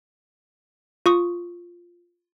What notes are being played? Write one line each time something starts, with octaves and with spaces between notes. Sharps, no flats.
F4 C#6 D#6